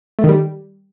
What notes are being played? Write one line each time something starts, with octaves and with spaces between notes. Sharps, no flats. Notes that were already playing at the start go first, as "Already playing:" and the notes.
A3
D#3
G3